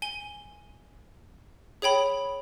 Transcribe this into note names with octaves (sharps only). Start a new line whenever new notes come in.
G#5 G7
G#4 C#5 G5 B5